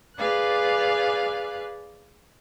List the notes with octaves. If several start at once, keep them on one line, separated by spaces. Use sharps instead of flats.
G#4 B4 D5 F5 F#6